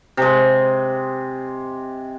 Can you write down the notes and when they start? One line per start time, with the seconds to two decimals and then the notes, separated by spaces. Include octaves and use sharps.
0.17 C3 G#3